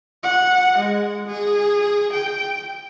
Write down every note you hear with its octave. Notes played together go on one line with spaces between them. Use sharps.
F#5
G#3
G#4
G5